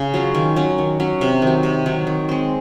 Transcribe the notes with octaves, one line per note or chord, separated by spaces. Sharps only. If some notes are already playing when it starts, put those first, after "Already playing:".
Already playing: C#3
F#3 C#4 F4
D#3
F#3 C#4
D#3
F#3 C#4
C3
D#3
F#3
C3
D#3 F#3
D#3
G#3 C4